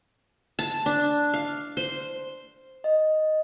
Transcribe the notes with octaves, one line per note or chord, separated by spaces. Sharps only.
A5
D4
F5
C5
D#5